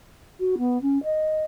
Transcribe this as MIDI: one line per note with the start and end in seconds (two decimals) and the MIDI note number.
0.40 0.55 66
0.58 0.81 59
0.82 1.02 61
1.03 1.44 75